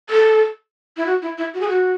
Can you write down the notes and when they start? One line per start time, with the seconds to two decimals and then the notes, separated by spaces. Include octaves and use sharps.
0.10 A4
0.97 E4
1.06 F#4
1.22 E4
1.38 E4
1.54 F#4
1.61 G#4
1.69 F#4